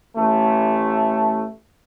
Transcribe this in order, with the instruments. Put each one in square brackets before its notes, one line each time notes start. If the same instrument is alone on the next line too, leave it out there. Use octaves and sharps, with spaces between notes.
[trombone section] A1 A3